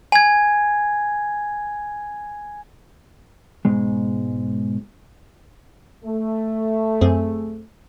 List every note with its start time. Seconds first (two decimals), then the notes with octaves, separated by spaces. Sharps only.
0.12 G#5 G#6
3.65 G#2 B2 G#3
6.05 A3
7.01 F#2 C4 G#4